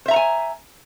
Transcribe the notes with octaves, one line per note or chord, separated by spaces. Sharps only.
C5 E5 F#5 G#5 A#5